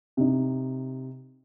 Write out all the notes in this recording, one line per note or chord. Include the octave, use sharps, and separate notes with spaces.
C3 D#4